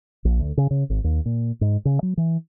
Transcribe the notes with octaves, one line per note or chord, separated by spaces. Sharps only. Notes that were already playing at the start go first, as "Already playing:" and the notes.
A#1
D2
C#3
C#3
G#1
D#2
A#2
G#2
C#3
F#3
E3